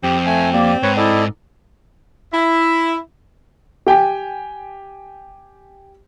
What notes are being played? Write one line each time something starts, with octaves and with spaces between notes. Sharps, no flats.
F2 C4 G4
A3 G#5
A#3 G4 D5
G#2 B4 C#5
E4 A4 D5 D#5
E4
G4 G5 G#5